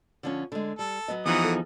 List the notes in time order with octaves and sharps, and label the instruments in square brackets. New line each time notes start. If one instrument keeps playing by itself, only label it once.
[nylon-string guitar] D3 F3 C#4
D3 G#3
[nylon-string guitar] G3 [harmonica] A4
[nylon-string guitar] F#3 B3 D#5
[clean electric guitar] E2 F3 D#4 [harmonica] E3 F#5 D#6
[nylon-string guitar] A4